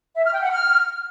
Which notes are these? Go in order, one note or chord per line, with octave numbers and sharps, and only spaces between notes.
E5
F6
G5
F#5
F6